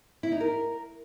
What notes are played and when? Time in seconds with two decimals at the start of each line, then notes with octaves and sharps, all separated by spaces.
0.23 E4
0.32 D#4
0.41 A#4